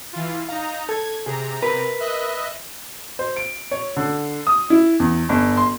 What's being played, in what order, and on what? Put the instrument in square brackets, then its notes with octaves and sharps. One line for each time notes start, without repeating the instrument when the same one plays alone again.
[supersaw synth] E3 F4
[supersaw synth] D#4 A#5 [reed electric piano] F5
[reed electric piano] A4 [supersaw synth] G#6
[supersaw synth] C3 A#5 [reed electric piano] G#4
[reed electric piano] A#4 [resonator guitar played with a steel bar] B4
[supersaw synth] D#5 E5 F#6
[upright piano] C5
D7
C#5
D3
D#6
E4
E2
G1
C6